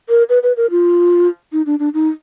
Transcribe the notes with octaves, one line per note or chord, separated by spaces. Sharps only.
A#4
B4
B4
A#4
F4
D#4
D4
D4
D#4